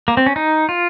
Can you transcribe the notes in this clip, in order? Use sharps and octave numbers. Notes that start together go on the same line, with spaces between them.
A#3
C4
C#4
D#4
F4